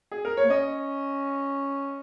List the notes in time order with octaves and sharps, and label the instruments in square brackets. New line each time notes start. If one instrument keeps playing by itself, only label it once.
[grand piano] G#4
A#4
C#5
[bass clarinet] A#3
[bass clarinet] C#4 [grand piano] D#5